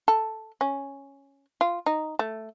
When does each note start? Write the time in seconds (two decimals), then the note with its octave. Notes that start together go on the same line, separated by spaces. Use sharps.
0.08 A4
0.61 C#4
1.61 F4
1.86 D#4
2.19 A3